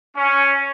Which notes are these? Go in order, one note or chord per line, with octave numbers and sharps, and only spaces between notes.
C#4